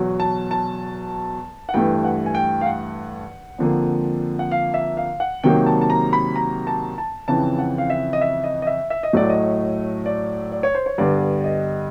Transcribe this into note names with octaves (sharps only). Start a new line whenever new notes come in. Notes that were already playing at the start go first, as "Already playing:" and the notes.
Already playing: E2 B2 F#3
A5
A5
F#5
G2 E3 A3 G5
F#5
G#5
G5
F5
F#5
F2 D3 F3 A#3
F#5
F5
E5
F5
F#5
C3 D#3 F#3 A#3 G5
A5
A5
A#5
B5
A#5
A5
A5
F2 C#3 E3 A5
F#5
F5
E5
D#5
E5
D#5
D#5
E5
E5
D#5
A2 F#3 A3 D5
D#5
D5
D5
C#5
C5
C#5
G2 D3 G3 B3 D5
D#5